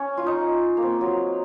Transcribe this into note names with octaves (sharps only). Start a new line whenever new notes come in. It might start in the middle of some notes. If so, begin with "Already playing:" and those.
Already playing: C#4
F4
D#4
A#3
C4
F#3